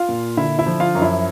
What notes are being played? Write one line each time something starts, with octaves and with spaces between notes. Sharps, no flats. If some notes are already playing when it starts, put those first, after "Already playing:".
Already playing: F4 F5
A#2
D3 E4 E5
E4 E5
F3
F4 F5
F#2
E4 E5